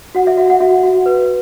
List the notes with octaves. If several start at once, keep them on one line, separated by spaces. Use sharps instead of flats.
F#4 F#5
E5
F#4 E5
F#5
F#4 E5
F#4
B4